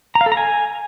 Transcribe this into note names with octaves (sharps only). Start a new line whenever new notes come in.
A#5
F5
A4
A#5
G#5